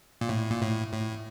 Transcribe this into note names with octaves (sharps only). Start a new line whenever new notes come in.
A#2
A2
A#2
A2
A2